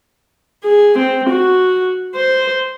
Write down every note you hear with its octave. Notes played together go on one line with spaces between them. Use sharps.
G#4
C4
F#4
C5